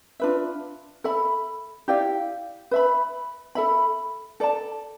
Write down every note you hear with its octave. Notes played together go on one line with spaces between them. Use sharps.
D4 F4 B4 E5
A4 E5 B5
E4 G4 D5 F5
B4 E5 B5
A4 E5 B5
A4 D5 A5